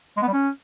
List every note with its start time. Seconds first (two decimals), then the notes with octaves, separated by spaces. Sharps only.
0.17 G#3
0.22 B3
0.28 G3
0.33 C#4